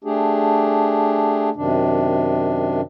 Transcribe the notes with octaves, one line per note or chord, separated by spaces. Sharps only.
A3 D4 G4 G#4
F#2 C3 D#3 D4